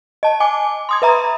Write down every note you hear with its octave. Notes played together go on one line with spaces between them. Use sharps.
D#5 A5
G#5 D6
C6 D#6 G#6
B4 E5 A#5 B5